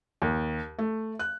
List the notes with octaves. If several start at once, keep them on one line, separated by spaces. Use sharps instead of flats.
D#2
A3
F#6